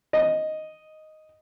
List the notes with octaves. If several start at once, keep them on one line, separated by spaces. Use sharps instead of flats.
D#5